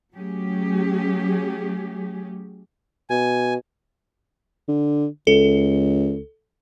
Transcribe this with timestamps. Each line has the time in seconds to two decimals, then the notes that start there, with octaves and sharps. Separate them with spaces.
0.15 F#3 A3 C#4 G4 G#4
3.10 B2 G#5
4.68 D3
5.27 C#2 A4